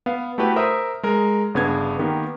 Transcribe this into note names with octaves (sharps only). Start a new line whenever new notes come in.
B3 F5
A3 E4 F#4 G4 B4
A#4 C5 E5 D#6
G#3 A#4
G1 C#3 B3 D4 G#6
D#3 A#3 B3 G4 A#4